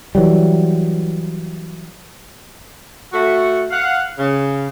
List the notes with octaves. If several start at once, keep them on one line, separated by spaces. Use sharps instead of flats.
E3 F#3 G3
A3 F#4
F5 F#5
C#3